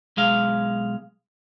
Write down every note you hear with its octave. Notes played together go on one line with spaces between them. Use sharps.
B1 G#3 F5